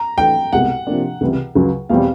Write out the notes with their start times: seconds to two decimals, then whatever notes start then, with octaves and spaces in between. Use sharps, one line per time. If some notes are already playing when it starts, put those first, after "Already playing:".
Already playing: A#5
0.18 E3 A3 D4 G5
0.52 C2 B2 G#3 F#5
0.87 C3 F3 A#3 D4
1.21 C#2 C3 E3 G3
1.55 C#2 C#3 F#3
1.89 E2 B2 G3 C4 F5